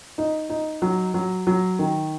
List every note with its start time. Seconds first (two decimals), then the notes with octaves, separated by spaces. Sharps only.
0.18 D#4
0.50 D#4
0.82 F#3
1.14 F#3
1.47 F#3
1.79 D#3